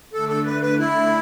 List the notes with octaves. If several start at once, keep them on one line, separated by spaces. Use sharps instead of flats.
D3 A3 D4 A4
A4
B4
B4
E4